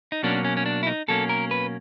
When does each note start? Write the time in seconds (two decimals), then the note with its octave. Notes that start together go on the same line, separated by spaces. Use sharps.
0.12 D#4
0.23 B2 F#3 A#3 C#4 D4
0.45 C#4
0.57 C#4
0.66 D4
0.83 E4
0.87 D#4
1.08 B2 F#3 A#3 C#4 A4
1.29 A#4
1.51 B4